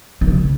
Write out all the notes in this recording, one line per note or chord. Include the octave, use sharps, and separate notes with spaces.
D#3
C#3